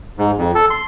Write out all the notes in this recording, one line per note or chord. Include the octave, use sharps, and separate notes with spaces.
G#2
F2
A4
C6